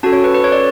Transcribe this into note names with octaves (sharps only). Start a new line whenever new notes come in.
C#4 F#4 A4 A5
C#5
B4
B4
C#5
D5